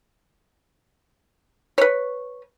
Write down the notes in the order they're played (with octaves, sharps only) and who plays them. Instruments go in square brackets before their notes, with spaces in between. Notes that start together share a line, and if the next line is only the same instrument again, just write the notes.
[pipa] B4 C#5